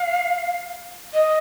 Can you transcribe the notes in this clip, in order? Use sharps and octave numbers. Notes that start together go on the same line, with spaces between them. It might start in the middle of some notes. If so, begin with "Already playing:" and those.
Already playing: F5
D#5